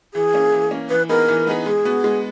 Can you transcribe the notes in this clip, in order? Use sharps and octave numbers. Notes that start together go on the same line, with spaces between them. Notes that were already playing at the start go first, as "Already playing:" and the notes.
E3 G#4
A#3 C#4
E3
A#3 C#4
E3 B4
B3 D#4 G#4 A#4 B4
E3
B3 D#4 G#4 B4
G#3 G#4
B3 F#4
G#3